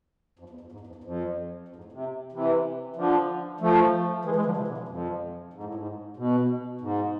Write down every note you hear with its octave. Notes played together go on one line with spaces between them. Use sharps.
F2
E2
F2
G#2
E2
F2
E2
F2
F2
G#2
A2
C3
C3 E3
D3 F3
F3 A3
E3 G#3
E3 G#3
D3 F3
C3 E3
B2 D3
C3
F2
G#2
A2
G#2
B2
G#2